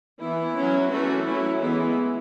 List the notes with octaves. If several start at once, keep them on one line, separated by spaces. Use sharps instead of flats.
E3 B3 E4
F#3 C#4
E3 A3 C#4 F#4
F#3 C#4 E4
E3 G#3 B3 E4